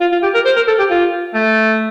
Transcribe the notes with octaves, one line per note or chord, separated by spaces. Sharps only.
F4
F4
G4
A#4
C5
A#4
A4
G4
F4
A3